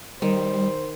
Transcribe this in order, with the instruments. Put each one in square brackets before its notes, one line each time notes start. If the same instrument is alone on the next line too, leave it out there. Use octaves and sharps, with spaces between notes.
[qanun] D#3 [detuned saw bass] G3 [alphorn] C5